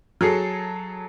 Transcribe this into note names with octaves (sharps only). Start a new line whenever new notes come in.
F#3 G#4 A4 C7